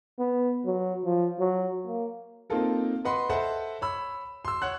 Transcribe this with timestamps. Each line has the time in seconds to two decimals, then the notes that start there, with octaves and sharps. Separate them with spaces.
0.19 B3
0.65 F#3
1.05 F3
1.40 F#3
1.87 A#3
2.50 A#3 C4 D#4 F4 A4 A#4
3.05 B4 D#5 F#5 B5 C6
3.29 A4 C5 D#5 E5 F#5 A5
3.81 C#5 B5 E6
4.45 C6 E6
4.62 C#5 F#5 F#6